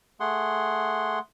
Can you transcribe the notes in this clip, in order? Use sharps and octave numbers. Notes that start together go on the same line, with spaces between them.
A3 G#4 F#5 C6